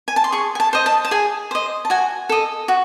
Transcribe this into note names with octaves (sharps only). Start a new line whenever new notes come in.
G#5
A5
C6
G#4 C#6
G#5
A5
C5 D#5
A5
A5
G#4 G#5
C5 D#5
A5
F#4 G#5
A4 D#5
F#4